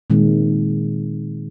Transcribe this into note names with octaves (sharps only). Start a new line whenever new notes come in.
A#2 D#3 G#3 C4